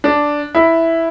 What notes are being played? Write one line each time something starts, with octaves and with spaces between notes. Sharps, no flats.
D4
E4